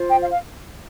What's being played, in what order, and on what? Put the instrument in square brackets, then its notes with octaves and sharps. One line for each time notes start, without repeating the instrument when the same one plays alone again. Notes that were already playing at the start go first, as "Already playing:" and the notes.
Already playing: [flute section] F4 C5
G5
F5
F5